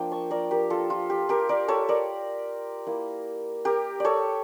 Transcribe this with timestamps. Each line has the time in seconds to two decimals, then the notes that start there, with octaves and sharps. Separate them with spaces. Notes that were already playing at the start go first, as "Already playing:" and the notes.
Already playing: F3 A#3 D4 G5
0.12 A5 C#6
0.31 A#4 D5
0.51 G4 A#4
0.70 F4 A4
0.90 F4
1.10 G4
1.29 G4 A#4
1.49 A#4 D5
1.68 A4 C#5
1.89 A#4 D5
2.86 A#3 E4
3.65 G4 A#4
4.00 A4 C#5 D5